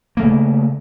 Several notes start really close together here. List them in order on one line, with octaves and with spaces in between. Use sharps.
A#3 A3 C#3